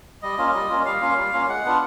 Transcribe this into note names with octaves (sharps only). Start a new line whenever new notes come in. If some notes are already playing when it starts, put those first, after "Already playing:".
G3 D#5
A#3 C#4 F4
G3
A#3 C#4 F4
G3 F5
A#3 C#4 F4
G3
A#3 C#4 F4
G#3 F#5
B3 D4 F4